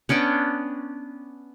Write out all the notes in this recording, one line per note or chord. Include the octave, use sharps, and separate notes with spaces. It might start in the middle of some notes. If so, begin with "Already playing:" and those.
B3 C#4 D4 G5